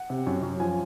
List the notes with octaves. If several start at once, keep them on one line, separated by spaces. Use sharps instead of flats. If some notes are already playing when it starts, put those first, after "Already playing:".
Already playing: F#5
C3
F#2
F#2
F3 G#5